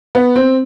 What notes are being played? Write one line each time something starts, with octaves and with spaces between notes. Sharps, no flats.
B3
C4